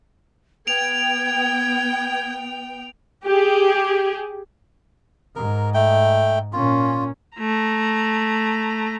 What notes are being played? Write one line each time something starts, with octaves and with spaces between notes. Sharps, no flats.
B3 G5 G#6 D7 F7
G4 G#4
G#2 A#4
A3 G5
A#2 C#4 F4
A3 A#5